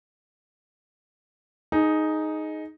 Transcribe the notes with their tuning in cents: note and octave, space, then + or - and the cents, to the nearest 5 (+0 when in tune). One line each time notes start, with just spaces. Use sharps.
D#4 +0 G#4 +20